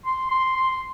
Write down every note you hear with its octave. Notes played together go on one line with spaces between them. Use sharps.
C6
C6
C6